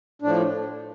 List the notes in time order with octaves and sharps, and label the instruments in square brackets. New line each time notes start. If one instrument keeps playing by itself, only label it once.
[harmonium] A2 F3 D4